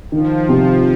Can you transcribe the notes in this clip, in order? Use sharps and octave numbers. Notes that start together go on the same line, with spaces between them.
D#3 F3
C3